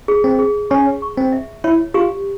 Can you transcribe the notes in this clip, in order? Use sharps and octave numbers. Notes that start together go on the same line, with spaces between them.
G#4
C4
G#4
C#4 C#6
C#6
C4
E5
E4 C#5
F4 G4